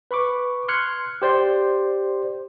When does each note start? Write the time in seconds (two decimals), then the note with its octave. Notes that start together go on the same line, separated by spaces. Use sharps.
0.11 B4 B5 C#6 D6
0.68 C6 F6 F#6 G#6 C#7
1.22 G4 C5 D5 C6